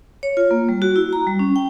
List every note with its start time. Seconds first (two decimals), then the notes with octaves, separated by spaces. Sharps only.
0.23 C#5
0.37 F4
0.51 A#3
0.69 G3
0.82 F#4
0.96 E4
1.13 A#5
1.27 G3
1.39 C#4
1.56 G5